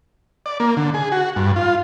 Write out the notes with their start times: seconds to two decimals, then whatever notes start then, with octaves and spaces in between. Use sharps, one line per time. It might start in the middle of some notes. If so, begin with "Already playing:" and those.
0.46 D5
0.60 A#3
0.77 D3
0.94 G#4
1.12 F#4
1.36 G2
1.56 F4